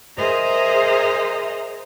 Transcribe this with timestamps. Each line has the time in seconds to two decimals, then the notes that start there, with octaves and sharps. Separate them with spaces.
0.17 G#4 A#4 C5 D#5 E5 A#5